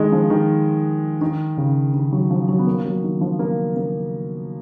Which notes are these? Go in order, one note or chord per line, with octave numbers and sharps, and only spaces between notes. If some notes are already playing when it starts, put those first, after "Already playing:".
Already playing: D#3 G#3
F3
D#3
D#3
C#3
D#3
F#3
F3
F#3
B3
A#3
F#3
D#3
F3
A#3
A#3